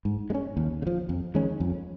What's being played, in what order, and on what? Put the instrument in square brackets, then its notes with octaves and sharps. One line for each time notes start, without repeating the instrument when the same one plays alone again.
[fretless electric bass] G#2
G#3
C#4
D#2
C#3
F3
F2
D#3 G#3 C#4
F2